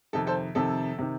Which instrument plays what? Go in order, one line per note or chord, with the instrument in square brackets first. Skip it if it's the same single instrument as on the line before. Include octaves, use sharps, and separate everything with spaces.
[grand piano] F2 C3 D#3 A4
A4 C5
F2 C3 D#3 A4
C3 D#3